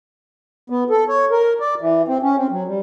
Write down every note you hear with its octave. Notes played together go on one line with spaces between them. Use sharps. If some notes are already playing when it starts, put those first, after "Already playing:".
B3
A4
C#5
A#4
D5
E3
C4
C#4
C4
F#3
G3